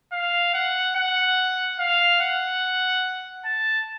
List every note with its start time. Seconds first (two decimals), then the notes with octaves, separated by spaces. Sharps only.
0.12 F5
0.54 F#5
0.96 F#5
1.79 F5
2.21 F#5
3.45 A5